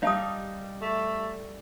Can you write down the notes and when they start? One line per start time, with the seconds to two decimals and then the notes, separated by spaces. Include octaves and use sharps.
0.03 G3 D#4 F5 A5 D#6
0.82 A3